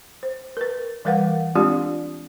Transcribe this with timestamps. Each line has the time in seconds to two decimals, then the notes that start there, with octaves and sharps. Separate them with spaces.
0.23 C5
0.57 A#4 B4
1.05 E3 G3 A#4 B4 F5 F#5
1.55 G#3 C4 D4 F4 G4 D5